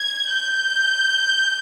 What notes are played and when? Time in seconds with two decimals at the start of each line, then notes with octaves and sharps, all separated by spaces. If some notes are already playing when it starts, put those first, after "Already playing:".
Already playing: G#6
0.30 G6